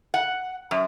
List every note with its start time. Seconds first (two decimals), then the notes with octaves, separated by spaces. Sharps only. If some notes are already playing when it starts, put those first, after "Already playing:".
0.14 F#5
0.71 F#2